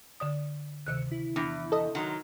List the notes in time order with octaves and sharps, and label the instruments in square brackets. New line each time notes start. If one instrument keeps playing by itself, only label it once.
[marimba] D3 D5 D#6
[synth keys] D2 E6 C#7 [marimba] C3 D#3 F#6
[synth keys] E4
[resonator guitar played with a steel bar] E2 [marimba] D4 A#6
[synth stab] A4 D#5
[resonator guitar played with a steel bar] D#3 F#3 [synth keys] F#5 C6 F#6